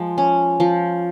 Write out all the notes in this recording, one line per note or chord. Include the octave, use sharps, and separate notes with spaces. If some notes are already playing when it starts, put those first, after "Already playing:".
Already playing: F3 G#3
C#4
F3